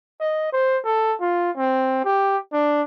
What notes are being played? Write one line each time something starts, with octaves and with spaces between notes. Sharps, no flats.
D#5
C5
A4
F4
C4
G4
D4